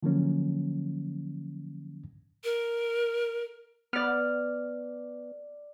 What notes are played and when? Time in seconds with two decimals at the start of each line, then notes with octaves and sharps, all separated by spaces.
0.03 D3 F3 F#3 A#3 C#4
2.44 A#4
3.93 B3 D5 F6